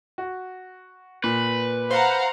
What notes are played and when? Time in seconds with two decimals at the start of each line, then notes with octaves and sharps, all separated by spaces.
0.18 F#4
1.24 A#2 B4
1.91 C5 F5 F#5 A#5